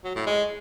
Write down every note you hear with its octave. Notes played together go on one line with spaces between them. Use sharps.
F#3
A2
G#3